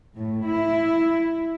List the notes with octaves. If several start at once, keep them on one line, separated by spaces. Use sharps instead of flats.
A2
E4